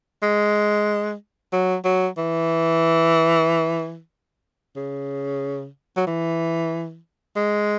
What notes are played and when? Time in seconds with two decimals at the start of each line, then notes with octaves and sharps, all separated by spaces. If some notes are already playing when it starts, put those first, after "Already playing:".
0.23 G#3
1.53 F#3
1.85 F#3
2.17 E3
4.76 C#3
5.97 F#3
6.06 E3
7.36 G#3